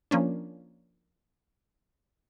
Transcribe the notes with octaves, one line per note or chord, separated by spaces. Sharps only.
F3 A#3 C#4 D4